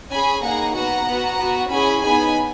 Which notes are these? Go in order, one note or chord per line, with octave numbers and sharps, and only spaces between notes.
C#4 G#4 G#5 B5
A#3 D#4 G#4 F#5 A#5
B3 F#4 F#5 A#5
B3 F#4
B3 F#4
C#4 E4 G#4 G#5 B5
B3 D#4 G#4 G#5 B5